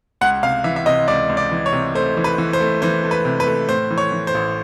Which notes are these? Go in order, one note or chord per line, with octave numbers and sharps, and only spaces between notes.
C#2 F#5
C3 F5
E3 E5
E5
C3 D#5
C#2 D5
C#2
D5
E3
C#5
C3
A3 C5
E3
B4
E3
C5
A3
E3 C5
A3
B4
C3
B4
A3
A2 C5
E3
C#5
E3
C5
A1